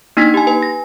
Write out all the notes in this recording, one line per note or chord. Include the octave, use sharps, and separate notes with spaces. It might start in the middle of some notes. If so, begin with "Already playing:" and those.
A#3 D4 D#4 G#6 A#6 B6
G4 G#5
B4 G#5
A#6